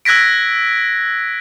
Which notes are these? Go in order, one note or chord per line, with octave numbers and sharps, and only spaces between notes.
E6 F#6 G#6 A#6 B6 D7